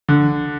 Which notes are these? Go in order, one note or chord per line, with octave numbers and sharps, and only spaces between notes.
D3